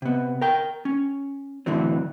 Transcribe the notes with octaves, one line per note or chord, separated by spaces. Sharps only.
C3 B3
A#4 G5
C#4
A2 D3 E3 F#3 C4